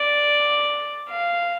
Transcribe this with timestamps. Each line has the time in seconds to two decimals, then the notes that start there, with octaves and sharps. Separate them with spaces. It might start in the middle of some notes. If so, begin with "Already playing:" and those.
Already playing: D5
1.09 F5